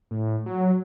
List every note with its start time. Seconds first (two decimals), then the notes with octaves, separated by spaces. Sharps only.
0.11 A2
0.46 F#3